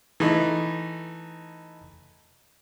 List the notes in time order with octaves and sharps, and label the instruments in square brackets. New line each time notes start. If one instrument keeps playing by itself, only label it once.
[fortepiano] E3 A3 D#4